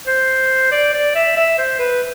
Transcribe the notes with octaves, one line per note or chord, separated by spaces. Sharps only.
C5
D5
D5
E5
E5
C5
B4